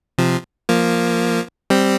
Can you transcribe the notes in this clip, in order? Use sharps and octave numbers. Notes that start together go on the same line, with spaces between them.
C3 F3
F3 A#3
G3 C4